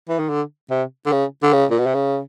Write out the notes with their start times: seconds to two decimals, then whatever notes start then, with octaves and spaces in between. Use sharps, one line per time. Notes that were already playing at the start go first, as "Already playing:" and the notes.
0.09 E3
0.19 D#3
0.29 D3
0.70 C3
1.06 D3
1.12 C#3
1.43 D3
1.53 C#3
1.70 A#2
1.79 B2
1.86 C3
1.94 C#3